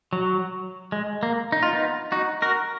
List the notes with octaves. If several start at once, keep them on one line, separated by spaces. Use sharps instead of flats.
F#3
G#3
A#3
D#4
F4
B3 D#4
D#4 F#4
F#4 A#4